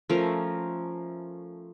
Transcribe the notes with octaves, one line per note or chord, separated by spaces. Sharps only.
F3 A3 C#4 A#4